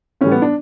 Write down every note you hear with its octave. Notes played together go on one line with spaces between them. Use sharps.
A2 E3 G3 C#4
B3
D4